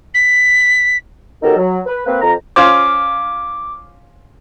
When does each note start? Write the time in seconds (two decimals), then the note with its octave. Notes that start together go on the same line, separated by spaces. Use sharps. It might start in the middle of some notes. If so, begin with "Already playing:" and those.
0.14 B6
1.43 B2 F#3 D#4 G4 A4 A#4
1.57 F#3
1.86 B4
2.06 A#3 C4 B4
2.21 F2 A#5
2.56 C#4 F4 C5 D6